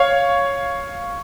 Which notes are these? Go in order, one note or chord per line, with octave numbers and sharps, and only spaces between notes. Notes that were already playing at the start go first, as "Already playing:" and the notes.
Already playing: C#5 F5